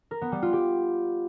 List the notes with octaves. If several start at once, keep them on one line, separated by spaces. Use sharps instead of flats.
A#4
B3
G3
F4
G4